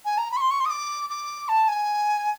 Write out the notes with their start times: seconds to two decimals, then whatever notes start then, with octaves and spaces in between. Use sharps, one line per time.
0.05 G#5
0.17 A#5
0.31 B5
0.36 C#6
0.41 C6
0.50 C#6
0.60 C6
0.65 D#6
0.70 D6
1.09 D6
1.48 A5
1.68 G#5